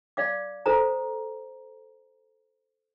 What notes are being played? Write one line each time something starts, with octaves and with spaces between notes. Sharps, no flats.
D5 F5 D6
A4 C5 A#5